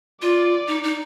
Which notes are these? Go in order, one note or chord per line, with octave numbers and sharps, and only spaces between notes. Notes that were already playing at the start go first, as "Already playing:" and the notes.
F4 D5
D#4
D#4